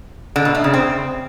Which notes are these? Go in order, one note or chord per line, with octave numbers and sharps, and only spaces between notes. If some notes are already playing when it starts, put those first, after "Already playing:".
D3
B2
A3
C#3
C4